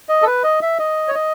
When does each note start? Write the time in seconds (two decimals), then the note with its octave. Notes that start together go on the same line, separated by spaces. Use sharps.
0.09 D#5
0.22 A4
0.27 B4
0.44 D#5
0.62 E5
0.79 D#5
1.08 C#5
1.15 D#5